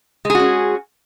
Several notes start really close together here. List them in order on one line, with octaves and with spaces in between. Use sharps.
G#3 G#4 F#4 C#4